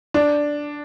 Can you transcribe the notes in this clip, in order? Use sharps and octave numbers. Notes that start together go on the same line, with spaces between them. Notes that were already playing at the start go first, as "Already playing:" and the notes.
D4